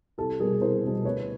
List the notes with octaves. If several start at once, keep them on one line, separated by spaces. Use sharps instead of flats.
C2 G4 A4
B2 G3 G#4 A#4
C2 A#4 C5
B2 G3
D2 B4 C#5